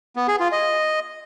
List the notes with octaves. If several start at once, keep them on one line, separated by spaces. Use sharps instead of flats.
B3
G#4
F4
D#5